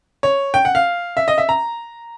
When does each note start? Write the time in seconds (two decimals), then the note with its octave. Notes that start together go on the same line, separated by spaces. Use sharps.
0.23 C#5
0.54 G5
0.65 F#5
0.75 F5
1.17 E5
1.28 D#5
1.38 E5
1.49 A#5